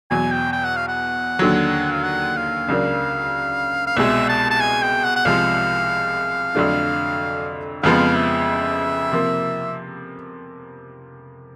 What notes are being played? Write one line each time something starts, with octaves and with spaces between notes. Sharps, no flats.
E2 B2 F#3 G#5
G5
G5
F#5
F5
F#5
D#2 D3 F#3
F5
F#5
F5
C#2 C#3 F#3 A#3 D4
F5
C2 B2 G#3 E5
A5
A5
G#5
G5
F#5
F#5
C2 C3 F3 G#3 F5
F2 D3 F#3 A3 D4
F2 C#3 F3 G#3 B3 F5
E5
C3 F3 A#3